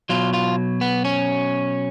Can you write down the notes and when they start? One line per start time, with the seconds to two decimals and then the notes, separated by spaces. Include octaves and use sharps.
0.09 B2 F#3 F4
0.34 F4
0.81 B3
1.05 C#4